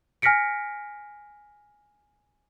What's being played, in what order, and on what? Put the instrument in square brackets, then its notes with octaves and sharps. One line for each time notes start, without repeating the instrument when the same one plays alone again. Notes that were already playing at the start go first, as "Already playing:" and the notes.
[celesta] G#5 F6 A#6 B6 C#7 D7